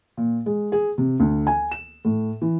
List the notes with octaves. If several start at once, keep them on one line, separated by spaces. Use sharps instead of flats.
A#2
G#3
G#4
C3
D2
G#5
E7
A2
E3